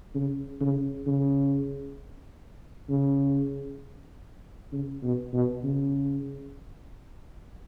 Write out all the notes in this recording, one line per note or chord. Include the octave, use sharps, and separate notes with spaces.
C#3
C#3
C#3
C#3
C#3
B2
B2
C#3